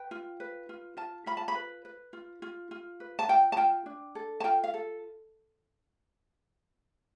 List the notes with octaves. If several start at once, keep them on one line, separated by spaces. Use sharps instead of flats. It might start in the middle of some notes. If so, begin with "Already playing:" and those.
Already playing: B4 G5
F4
B4
F4
F4 A5
F4 B5
A5
B5
B4
B4
F4
F4
F4
B4
A5
F4 G5
A5
F4 G5
D4
A4
A5
F4 G5
F5
A4